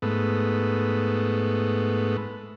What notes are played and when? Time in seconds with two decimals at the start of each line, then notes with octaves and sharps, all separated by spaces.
0.02 G#2 A3 B3